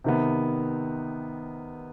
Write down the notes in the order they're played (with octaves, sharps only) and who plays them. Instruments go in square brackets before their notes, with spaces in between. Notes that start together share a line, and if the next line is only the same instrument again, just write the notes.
[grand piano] C3 D#3 B3